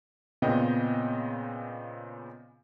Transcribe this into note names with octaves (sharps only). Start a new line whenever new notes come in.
A#2 C#3 B3 C4 D#5 G5